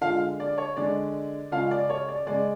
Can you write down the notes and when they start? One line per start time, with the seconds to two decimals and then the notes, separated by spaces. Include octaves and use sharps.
0.01 D3 G#3 F4 F5
0.40 D5
0.58 C#5
0.77 D3 G#3 D5
1.52 C#3 G#3 F4 F5
1.71 D5
1.90 C#5
2.08 D5
2.27 C#3 G#3 D5